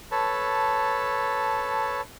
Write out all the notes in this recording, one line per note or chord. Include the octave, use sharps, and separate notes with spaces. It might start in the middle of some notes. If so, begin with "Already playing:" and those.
A4 B4 C#5 A5